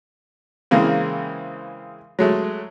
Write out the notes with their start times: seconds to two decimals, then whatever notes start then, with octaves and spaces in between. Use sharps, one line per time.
0.71 C#3 E3 G#3 A#3 C4
2.19 F#3 G#3 A3